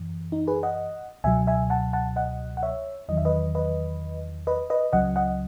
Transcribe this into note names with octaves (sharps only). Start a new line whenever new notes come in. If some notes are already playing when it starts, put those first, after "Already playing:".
Already playing: F#2 E3
D#4
G#4 B4
D#5 F#5
C#2 B2 F#3 E5 G#5
E5 G#5
F#5 A5
F#5 A5
D#5 F#5
F#5
C#5 E5
E2 D#3 F#3 D#5
E5
B4 D#5
B4 D#5
B4 D#5
B4 D#5
C#2 C#3 F#3 D#5 F#5
D#5 F#5